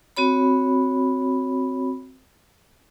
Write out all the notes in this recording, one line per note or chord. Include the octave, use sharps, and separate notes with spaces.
C4 F#4 C#5 B5